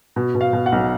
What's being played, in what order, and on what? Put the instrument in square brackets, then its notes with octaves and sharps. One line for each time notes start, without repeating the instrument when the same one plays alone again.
[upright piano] B2
B2
F5
B2
F#5
B1